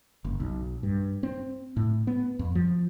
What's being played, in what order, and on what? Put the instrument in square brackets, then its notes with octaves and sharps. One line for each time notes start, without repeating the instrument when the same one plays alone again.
[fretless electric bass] F#1
B1
G2
C4
A2
B3
F2
F3